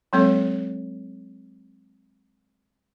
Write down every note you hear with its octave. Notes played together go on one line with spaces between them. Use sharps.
F#3 G#3 A#3 C4 A4 C#5